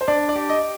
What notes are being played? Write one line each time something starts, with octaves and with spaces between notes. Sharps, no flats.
C5
D4 D5
D5
G4
D#5